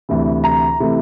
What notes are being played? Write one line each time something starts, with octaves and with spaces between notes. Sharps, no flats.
D2 C3 E3
A#5
C3 E3 A3